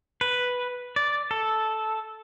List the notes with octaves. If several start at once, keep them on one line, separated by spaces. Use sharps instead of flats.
B4
D5
A4